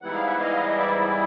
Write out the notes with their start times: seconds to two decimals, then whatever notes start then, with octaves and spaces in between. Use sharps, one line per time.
0.02 G#2 E3 G3 B3 E4 F#5
0.14 F5
0.26 E5 F#5
0.40 D#5 F5
0.70 D#5
0.78 D5 E5